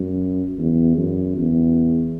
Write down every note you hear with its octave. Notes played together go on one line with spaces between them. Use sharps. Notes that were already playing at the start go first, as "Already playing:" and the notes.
Already playing: F#2
E2
F#2
E2